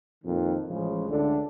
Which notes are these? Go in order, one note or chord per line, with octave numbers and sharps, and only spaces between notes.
F2 A#2 D#3
A1 C#3 F3 G#3
C#2 D3 A3 D4 A4